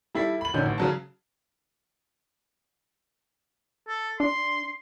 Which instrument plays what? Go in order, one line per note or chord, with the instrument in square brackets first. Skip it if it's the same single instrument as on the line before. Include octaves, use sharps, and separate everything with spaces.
[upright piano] G3 E4 A4 B6
B5 F#7
A#1 D3 C#4 D#4 G6
A1
C#3 F#3 A5
[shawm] A4
[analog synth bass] D4 [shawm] C6